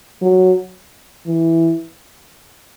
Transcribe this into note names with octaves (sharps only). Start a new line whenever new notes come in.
F#3
E3